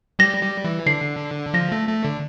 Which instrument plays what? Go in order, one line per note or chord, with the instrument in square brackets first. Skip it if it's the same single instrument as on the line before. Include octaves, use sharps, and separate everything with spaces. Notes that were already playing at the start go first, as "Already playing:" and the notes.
[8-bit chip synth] G3 [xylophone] A#6
[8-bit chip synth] G3
E3
[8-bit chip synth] D3 [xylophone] C7
[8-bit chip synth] F3 [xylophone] A#6
[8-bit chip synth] A3
A3
D3